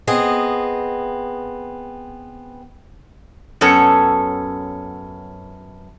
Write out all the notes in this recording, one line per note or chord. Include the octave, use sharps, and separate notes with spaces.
B3 C4 G#4 D#5
F#2 B3 C#4 A4